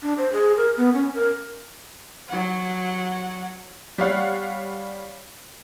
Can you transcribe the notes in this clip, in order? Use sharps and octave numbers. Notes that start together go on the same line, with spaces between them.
D4
C5
G#4
A#4
B3
C#4
A#4
F#3 F#5
G3 C#5 F5 F#5